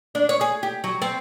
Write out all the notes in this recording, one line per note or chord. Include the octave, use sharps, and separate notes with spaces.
D4
C#5
G#4
G4
F#3
C4